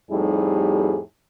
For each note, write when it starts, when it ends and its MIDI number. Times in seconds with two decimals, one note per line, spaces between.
0.11 0.98 41
0.11 0.98 45
0.11 0.98 55
0.11 0.98 63
0.11 0.98 67
0.11 0.98 68